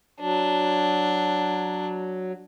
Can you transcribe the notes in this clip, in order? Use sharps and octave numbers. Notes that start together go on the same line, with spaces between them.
F#3 D4